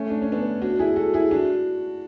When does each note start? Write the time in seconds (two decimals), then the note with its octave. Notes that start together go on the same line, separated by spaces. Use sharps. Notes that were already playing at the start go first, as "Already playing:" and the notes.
Already playing: A3 C#4
0.10 D4
0.22 C#4
0.32 B3 D4
0.62 D4 F#4
0.79 E4 G#4
0.96 F#4 A4
1.13 E4 G#4
1.31 D4 F#4